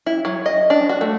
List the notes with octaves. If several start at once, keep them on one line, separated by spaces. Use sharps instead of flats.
E4
F#3
D#5
D4
F#4
A3